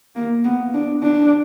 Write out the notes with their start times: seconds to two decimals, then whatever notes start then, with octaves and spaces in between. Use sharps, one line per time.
0.16 A#3
0.45 B3
0.74 D4
1.03 D4